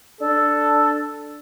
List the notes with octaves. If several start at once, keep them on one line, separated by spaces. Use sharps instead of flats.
D4 A4